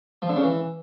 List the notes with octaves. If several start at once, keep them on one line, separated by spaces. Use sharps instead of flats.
F3
D3
C#3
E3